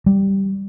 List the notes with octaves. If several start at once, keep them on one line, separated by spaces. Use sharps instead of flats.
G3